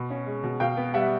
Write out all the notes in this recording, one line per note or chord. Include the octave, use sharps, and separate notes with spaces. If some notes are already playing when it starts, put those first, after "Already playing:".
Already playing: B2 B5
C#4
G#3
B2
B2 F5 G5
B3
G3 E5 F#5